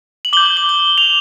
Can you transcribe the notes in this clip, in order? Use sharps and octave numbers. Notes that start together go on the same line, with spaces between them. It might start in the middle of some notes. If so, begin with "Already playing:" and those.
F#7
D6 G6 G7
G7
G7
G7
F7